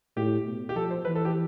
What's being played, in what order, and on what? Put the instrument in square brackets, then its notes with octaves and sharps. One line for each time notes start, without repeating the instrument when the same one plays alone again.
[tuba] A2 [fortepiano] G4
[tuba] B2
[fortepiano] G4
[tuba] F3 [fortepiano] A4
[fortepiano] C5
[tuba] E3 [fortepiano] B4
[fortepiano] A4
G4